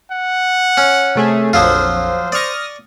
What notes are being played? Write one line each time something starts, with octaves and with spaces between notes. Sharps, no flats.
F#5
C#4
C3 A3 G#4
A#1 F2 F3 F#3 F4 C5
C5
D5 C#6 D#6 F6 A#6